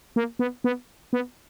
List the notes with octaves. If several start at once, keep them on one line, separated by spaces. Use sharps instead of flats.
A#3
B3
B3
B3